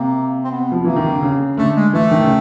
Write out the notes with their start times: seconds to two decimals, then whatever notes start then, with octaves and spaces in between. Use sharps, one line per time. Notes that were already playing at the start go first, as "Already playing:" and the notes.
Already playing: C3 A#3
0.44 C4
0.51 B3
0.72 F3
0.84 E3 A#3
0.96 D#3
1.10 D3
1.22 C#3
1.57 D3 A3
1.75 G#3
1.93 E3 A3
2.11 D#3
2.24 C#3